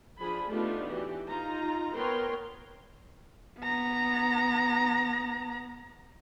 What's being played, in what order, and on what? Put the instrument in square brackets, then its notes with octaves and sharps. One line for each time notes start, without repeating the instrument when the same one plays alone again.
[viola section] F3 D4 G#4 B5
A3 B3 D4 D#4 F4 G4
E3 F#4 G4
D#4 F4 A#5
B3 A#4 B4 C#5 G5 C6
[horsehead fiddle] B3 A#5